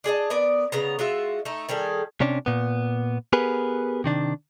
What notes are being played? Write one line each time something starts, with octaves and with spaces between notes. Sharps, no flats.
D4 G#4 D#5 A5
B3 A#4 D5
C#3 B3 A#5
G#3 F4 F#4 E5
A3 D#4
D#3 G3 G#4 A4
C3 C#4 D4
A#2 B3
B3 G4 G#4 A#4 B4
C3 D#3 D4